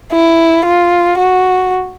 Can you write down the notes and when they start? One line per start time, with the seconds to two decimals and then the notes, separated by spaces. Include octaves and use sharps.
0.13 E4
0.65 F4
1.18 F#4